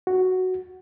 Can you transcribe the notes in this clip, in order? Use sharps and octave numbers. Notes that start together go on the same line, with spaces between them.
F#4